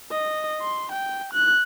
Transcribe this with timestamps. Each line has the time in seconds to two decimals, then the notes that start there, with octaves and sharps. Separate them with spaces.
0.11 D#5
0.61 C6
0.92 G5
1.33 F#6